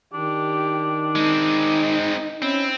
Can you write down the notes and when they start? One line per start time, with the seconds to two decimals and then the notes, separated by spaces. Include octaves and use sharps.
0.14 D#3 D4 G4
1.15 G#3 C4 D#4
2.42 C4 C#4 E4